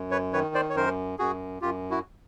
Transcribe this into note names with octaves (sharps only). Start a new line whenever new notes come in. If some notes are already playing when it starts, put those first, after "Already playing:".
Already playing: F#2
B4 C#5
D#3 B4 C#5
C5 D5
C#5
F#2 A#4 C5
F#2 F#4 G#4
F#2 F4 G4
E4 F#4